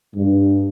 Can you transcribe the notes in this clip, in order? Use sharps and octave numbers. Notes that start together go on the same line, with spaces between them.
G2